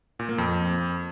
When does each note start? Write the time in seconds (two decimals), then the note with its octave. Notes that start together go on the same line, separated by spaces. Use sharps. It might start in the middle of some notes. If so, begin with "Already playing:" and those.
0.19 A#2
0.29 A#3
0.38 F2